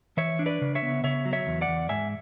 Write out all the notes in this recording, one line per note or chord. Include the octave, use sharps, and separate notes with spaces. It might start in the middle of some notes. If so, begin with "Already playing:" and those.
E3 C#5 E5
D4
B4 D5
C#3
C#5 E5
B3
C#3 C#5 E5
F#3
C#5 E5
E2
D5 F#5
E2
G#2 E5 G#5